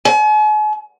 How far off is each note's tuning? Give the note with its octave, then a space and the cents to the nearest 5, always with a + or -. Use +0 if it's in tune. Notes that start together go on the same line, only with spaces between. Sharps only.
G#5 +45